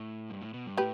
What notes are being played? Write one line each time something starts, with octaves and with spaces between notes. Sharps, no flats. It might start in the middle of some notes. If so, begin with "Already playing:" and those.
Already playing: A2
G2
A2
B2
G2
A2 G4 B4